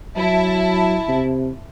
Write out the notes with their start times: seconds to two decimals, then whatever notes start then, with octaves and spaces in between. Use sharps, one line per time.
0.17 F#3 E4 A5
1.08 C3